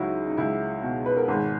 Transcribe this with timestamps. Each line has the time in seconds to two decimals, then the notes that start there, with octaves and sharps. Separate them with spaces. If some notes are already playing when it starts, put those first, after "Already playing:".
Already playing: C#2 F#3 D#4 E4 F#4
0.27 D#4
0.37 C#2 E4
0.82 B2
1.06 B4
1.17 A#4
1.28 G#1 G#4